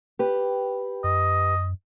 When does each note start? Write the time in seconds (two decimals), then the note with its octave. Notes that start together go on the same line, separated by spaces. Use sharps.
0.19 G4 B4
1.04 F#2 D#5